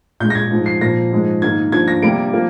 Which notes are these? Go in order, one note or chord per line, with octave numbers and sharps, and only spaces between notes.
A#2 G#3 G6
A#6
G#6
G#2 F3 G#3
C7
A#2 F3 A#3 A#6
G#2 F3 G#3
G#2 D#3 A#3 G#6
G2 F3 A#3 G#6
A#6
C3 G3 A#3 D7
F3 A#3